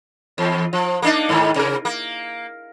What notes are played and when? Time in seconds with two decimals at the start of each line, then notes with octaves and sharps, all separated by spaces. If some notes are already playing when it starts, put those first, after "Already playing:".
0.38 E2
0.73 F3
1.02 A#3 D4 D#4
1.29 G#2 D#3
1.56 C3 A#4
1.85 A#3